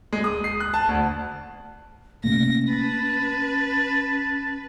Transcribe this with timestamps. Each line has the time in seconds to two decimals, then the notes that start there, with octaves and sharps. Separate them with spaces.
0.13 G#3
0.24 D#6
0.44 C7
0.60 F#6
0.74 A5
0.89 D2
2.24 C3 A3 A#3 C#4 A#6
2.70 B4 A5